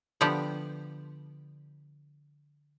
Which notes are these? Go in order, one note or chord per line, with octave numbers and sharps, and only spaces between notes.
D3 F3 B3 G4 F#5